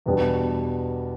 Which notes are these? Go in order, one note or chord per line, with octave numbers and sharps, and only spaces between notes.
E2 B2 G3 B3 D4